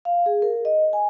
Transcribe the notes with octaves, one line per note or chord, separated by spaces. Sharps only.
F5
G#4
A#4
D#5
G#5